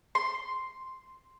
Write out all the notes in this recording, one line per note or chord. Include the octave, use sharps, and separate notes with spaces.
C6